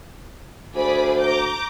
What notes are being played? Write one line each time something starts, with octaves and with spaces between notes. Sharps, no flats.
D2 G#4 C5 D5 B5
A#5 D6 G6